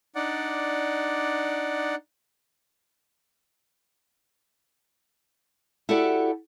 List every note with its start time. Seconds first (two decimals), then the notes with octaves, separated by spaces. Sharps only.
0.15 D4 D#4 D5 F#5
5.89 E4 F#4 G4 A4 D5 F#5